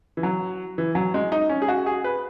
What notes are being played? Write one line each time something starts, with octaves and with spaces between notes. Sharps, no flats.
E3
F#3
E3
F#3
G#3
D#4
C#4
G#4
F#4
G#4
B4